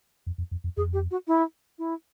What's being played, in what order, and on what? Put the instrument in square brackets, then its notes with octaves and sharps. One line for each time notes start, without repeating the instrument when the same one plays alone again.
[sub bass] F2
F2
F2
F2
[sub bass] F2 [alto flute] G#4
[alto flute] G4
F#4
E4
E4